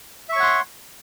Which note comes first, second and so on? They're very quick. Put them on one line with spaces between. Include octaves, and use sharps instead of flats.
E5 C#6 C#5 F#5 C6